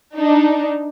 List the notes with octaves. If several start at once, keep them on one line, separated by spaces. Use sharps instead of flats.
D4 D#4